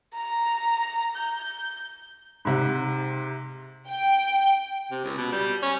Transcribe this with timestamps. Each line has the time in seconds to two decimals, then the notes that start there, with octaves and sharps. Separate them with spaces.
0.14 A#5
1.15 G6
2.45 G#2 C3
3.89 G5
4.91 C3
5.04 C#2
5.18 B2
5.32 G3
5.63 C#4